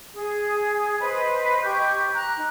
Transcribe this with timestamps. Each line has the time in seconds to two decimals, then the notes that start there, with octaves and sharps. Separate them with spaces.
0.14 G#4
0.99 B4 C5 D#5
1.63 G4 C#6 G6
2.14 A#5 F#6
2.37 D#4